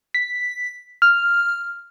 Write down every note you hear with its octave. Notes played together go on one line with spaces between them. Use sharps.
B6
F6